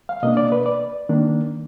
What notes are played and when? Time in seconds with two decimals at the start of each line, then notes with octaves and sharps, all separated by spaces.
0.09 F5
0.23 B2 A#3 D4 D#5
0.37 D5
0.52 B4
0.66 D5
1.09 D#3 A#3 D4